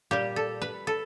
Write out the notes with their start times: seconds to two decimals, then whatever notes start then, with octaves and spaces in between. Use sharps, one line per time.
0.11 A#2 G3 G4
0.36 A4
0.62 B4
0.87 A4